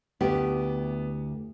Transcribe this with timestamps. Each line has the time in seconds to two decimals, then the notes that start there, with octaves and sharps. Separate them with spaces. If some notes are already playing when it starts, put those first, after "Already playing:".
0.21 D2 B3 E4 G4